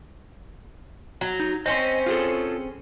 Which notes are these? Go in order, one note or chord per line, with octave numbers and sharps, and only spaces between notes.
F#3
D#4
C4 C#4 C5 D#5
F4 G#4 A4